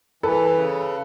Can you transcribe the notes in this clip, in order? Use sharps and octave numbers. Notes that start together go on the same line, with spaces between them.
E3 A4 B4
C#3